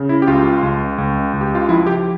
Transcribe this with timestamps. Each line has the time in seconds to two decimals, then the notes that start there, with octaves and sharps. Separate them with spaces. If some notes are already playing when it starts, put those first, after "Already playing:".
Already playing: C#3
0.09 E4
0.22 G4
0.28 C#2 F4
0.63 C#2
0.98 C#2
1.33 C#2
1.41 G4
1.55 F4
1.69 F3 E4
1.87 G4